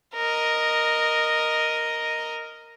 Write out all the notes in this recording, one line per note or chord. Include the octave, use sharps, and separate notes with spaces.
A#4 D#5